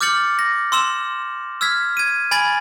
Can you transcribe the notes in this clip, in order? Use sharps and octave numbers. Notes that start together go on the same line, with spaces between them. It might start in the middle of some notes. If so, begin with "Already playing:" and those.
D6 F6 G6 A6 C#7 F#7
A#6
C6 E6 E7 F#7
E6 F6 G#6 B6
G#6 D#7
G#5 B5 G#6 A6 D7 F#7